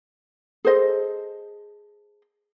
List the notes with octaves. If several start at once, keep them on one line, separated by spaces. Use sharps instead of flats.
G#4 A4 C5 D#5